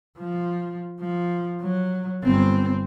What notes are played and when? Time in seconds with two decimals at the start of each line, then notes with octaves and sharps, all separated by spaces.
0.18 F3
1.01 F3
1.61 F#3
2.24 G1 C4